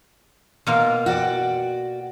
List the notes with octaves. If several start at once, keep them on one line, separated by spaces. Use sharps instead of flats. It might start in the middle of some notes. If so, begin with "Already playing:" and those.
B2 A#3 F4
F#4 D5 G5